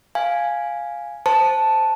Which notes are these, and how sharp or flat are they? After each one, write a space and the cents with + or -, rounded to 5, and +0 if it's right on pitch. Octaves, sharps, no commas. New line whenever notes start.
F5 +0 G#5 +0
C5 +0 A5 +0